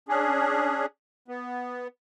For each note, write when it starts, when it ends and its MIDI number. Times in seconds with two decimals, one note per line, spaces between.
0.09 0.86 61
0.09 0.86 62
0.09 0.86 68
1.28 1.88 59